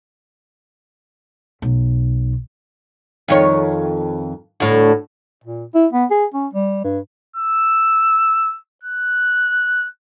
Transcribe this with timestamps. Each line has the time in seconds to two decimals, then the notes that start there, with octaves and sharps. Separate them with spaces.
1.62 B1
3.28 F2 D#3 C#5
4.60 D2 A2
5.44 A#2
5.75 E4
5.93 B3
6.11 G#4
6.34 C#4
6.54 G3
6.84 G2
7.36 E6
8.84 F#6